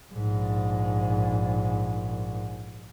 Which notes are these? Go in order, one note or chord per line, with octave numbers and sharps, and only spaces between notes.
A#1 G#2